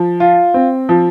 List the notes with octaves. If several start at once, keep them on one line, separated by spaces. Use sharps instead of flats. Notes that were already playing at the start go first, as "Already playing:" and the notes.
Already playing: F3
F4
C4
F3